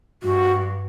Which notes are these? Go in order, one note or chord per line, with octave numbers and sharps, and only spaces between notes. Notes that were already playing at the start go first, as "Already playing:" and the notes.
G2 F#4